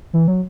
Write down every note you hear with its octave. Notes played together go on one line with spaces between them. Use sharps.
E3
F#3